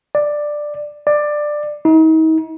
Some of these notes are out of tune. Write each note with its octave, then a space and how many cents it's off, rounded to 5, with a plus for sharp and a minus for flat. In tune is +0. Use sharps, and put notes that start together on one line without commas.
D5 +10
D5 +15
D#4 +40